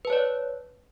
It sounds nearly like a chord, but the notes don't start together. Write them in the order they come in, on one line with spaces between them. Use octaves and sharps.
B4 A5 C#5 D5